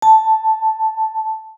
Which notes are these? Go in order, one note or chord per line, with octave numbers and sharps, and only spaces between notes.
A5